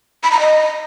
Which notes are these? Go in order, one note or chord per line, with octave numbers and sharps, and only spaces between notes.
B5
A#5
D#5